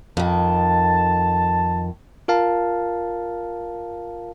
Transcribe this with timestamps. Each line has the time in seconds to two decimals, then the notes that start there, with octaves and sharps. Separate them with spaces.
0.17 F2 D#3 A5
2.28 F4 A#4 F5 A5